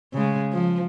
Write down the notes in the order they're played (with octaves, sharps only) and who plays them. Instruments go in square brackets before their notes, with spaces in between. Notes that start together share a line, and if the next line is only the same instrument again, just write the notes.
[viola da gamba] C#3 G#3
F3